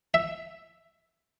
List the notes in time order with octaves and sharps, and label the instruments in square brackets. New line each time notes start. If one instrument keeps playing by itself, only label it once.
[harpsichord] E5